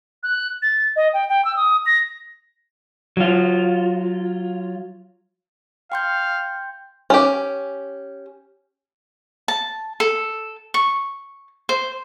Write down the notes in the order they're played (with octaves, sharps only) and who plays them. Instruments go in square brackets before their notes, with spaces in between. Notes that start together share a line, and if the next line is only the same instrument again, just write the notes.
[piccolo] F#6
A6
D#5
G5
G5
E6
D#6
A#6
[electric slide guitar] F#3 F4
[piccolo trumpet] F5 [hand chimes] G5 C6 G6
[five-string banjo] C#4 G4
[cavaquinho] A5
A4
C#6
C5